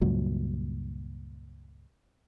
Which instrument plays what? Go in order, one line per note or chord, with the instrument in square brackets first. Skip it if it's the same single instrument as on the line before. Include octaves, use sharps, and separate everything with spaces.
[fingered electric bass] C#2 G2 A#2 F#3